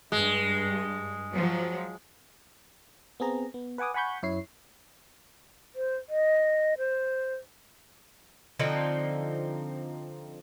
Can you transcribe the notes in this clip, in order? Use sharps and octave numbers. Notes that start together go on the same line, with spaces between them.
G2 G#3
F3 F#3
B3 C4 G#4 A#5
B3
B4 F#5 G#5 D6 D#6
F#5 G#5 B5 C#6 G6
F#2 E4 C#5 C7
C5
D#5
C5
D3 F3 C4 D#4